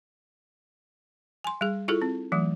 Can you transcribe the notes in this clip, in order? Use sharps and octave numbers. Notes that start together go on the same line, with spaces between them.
G#5 C6
G3 G#4
E4 F4 G#4 A4
C4
E3 F#3 A3